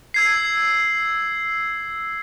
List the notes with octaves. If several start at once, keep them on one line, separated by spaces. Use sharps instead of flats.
E6 G#6 C7